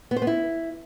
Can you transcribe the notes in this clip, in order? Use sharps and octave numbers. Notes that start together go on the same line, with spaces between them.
B3
C5
B3
E4